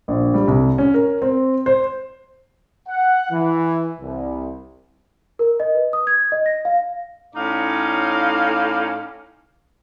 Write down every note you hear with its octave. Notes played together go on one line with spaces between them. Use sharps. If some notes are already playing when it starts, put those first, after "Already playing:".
A#1
G3
C2
C#4
A#4
C4
C5
F#5
E3
C2
A#4
D#5
B4
D#6
G#6
D#5
A#6
F5
A2 C#4 D#4 D5 F5